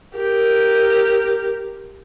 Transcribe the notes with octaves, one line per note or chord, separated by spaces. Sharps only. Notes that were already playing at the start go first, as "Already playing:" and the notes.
G4 A#4